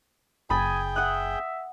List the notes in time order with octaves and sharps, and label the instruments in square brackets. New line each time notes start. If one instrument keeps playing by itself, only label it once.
[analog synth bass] F#1 [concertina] G#4 G5 [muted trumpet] G#5 [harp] B5 D#6 A6
[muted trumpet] E5 [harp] F#5 D#6 F#6